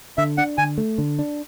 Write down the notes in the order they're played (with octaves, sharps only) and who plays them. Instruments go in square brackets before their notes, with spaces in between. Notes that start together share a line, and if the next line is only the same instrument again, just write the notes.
[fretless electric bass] D3 [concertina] E5
[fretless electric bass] D4 [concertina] F#5
[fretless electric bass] D3 [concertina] G#5
[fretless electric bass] A3
D3
D4